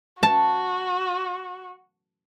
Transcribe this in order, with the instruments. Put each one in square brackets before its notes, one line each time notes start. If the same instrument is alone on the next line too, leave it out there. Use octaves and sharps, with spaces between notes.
[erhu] F#4 [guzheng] A5